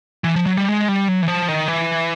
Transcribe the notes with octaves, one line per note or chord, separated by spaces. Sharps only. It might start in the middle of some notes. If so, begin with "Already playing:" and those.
E3
F3
F#3
G3
G#3
G3
F#3
E3
F3
D#3
E3